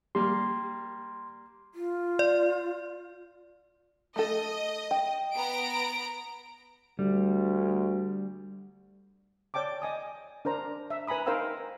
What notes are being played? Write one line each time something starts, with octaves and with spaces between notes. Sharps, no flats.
G3 A#3 C6
F4
D5
A3 A4 D#5
G5
B3 A#5 D7
D2 G3
C#5 D5 G5 A5 D6
D#5 G#5 D#6
D4 A#4 C5 A#5
E5
B4 G#5 A#5 B5 D#6
D#4 A#4 C5 F5 G5 E6